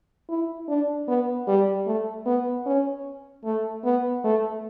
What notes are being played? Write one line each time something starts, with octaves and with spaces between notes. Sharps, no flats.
E4
D4
B3
G3
A3
B3
C#4
A3
B3
A3